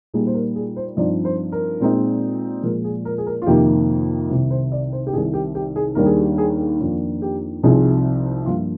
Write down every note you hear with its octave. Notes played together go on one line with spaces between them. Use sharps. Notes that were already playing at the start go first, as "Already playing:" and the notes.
A#2 G3 A#3 D#4 G#4
C5
A#4
G#4
C5
G2 F3 C4 D#4 D5
C5
A#4
A#2 G#3 C4 D#4
A#2 F3 G#3 A#4
G#4
A#4
G#4
A#4
F4
F2 C3 D#3 A#3 D#4 G4
C2 C3 D#3
C5
D5
C5
G4
C2 C3 D#3 G#4
G4
G4
G#4
D#2 D#3 G3 D4 A#4
G#4
G4
G#4
G#4
F2 D#3 A#3 D4 F4
G4
C2 C3 F3 C4 D#4 G#4
G2 F3 A#3 F4